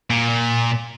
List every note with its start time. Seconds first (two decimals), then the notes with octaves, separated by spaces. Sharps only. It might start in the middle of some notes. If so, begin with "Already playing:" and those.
0.10 A#2